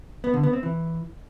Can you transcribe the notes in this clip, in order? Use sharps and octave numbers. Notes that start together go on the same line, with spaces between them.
B3
D3
B3
C4
E3